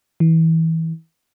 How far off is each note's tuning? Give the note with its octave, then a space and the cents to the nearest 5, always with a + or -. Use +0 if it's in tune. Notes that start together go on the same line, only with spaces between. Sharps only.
E3 -25